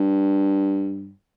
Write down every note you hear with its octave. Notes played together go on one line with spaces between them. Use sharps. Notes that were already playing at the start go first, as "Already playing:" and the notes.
Already playing: G2